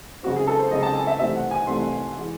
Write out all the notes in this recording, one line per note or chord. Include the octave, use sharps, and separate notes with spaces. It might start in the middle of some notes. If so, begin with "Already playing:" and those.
F#2 C#3 G#3 C4 F#4
G#4
A4
C5
F#2 C#3 G#3 C4 D#5
A5
G#5
E5
C2 C3 E3 A3 C4 E5
F#5
G#5
C2 C3 E3 A3 C4 C6
E3 G#3